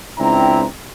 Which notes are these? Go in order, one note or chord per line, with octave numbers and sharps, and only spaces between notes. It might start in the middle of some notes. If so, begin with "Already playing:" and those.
C#2 C4 D4 E4 G5 A#5